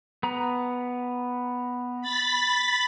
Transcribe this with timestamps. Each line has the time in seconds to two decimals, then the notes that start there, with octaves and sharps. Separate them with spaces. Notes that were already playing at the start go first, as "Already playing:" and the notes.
0.23 B3 A#5
2.01 B5 A6 B6